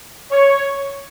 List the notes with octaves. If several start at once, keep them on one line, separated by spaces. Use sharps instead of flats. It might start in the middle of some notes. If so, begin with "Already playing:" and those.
C#5